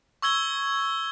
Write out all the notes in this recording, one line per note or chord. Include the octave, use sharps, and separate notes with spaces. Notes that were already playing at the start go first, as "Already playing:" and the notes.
C#6 E6 G#6 G7